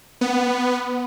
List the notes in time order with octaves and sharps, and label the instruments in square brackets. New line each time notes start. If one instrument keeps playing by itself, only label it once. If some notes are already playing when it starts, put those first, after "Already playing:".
[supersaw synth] B3